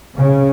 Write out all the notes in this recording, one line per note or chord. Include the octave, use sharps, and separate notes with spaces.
C#3